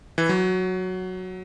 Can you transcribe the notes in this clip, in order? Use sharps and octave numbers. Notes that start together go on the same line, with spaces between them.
E3
F#3